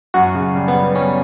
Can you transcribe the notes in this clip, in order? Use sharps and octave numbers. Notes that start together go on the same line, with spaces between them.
F#2 F#4
C#3
G3
B3
G3
G3 C#4